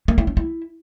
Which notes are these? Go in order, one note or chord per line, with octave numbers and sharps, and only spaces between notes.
A#3
E4
C#4
E4